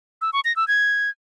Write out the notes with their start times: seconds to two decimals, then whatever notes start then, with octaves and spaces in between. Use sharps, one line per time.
0.22 E6
0.33 C#6
0.45 A#6
0.56 E6
0.68 G#6